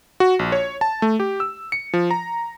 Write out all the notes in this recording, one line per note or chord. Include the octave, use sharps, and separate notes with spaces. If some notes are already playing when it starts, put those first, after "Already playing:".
F#4
A#1
C#5
A5
A3
G4
E6
C#7
F3
A#5